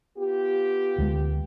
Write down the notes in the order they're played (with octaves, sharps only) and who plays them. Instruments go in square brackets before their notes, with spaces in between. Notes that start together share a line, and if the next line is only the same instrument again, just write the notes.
[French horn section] B3 F4 G4
[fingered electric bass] D2 G#3